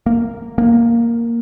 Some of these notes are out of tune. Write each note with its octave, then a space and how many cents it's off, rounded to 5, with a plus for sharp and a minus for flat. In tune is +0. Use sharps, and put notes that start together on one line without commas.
A#3 -10
A#3 +0